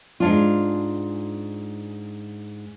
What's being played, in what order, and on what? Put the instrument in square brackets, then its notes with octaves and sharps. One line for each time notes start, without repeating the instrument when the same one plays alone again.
[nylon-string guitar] G#2 D4 F4